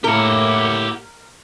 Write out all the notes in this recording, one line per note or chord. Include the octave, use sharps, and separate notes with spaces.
A2 A#3 E4 G4 A#4 F#5